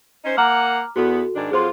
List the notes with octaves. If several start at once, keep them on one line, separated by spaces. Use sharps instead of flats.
C#4 D#4 C5
A#3 F#5 A#5 D6 F6
E2 B3 F#4 A4
G#2 D#3 D4
F2 F#3 F4 G#4 C5 C6